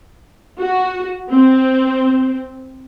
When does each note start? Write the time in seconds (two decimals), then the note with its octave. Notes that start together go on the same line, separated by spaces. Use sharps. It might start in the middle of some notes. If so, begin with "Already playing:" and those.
0.60 F#4
1.29 C4